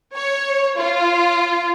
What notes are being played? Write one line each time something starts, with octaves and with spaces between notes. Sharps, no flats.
C#5
F4